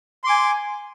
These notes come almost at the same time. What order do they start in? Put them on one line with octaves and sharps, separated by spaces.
C6 D6 G#5